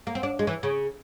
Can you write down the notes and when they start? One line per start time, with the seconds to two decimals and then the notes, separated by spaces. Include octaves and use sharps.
0.07 A#3
0.15 C4
0.23 D4
0.39 G#3
0.47 E3
0.63 C#3